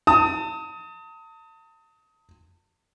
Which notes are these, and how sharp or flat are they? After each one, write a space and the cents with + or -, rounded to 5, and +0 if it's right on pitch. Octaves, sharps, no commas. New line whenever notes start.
A5 +40 D#6 +25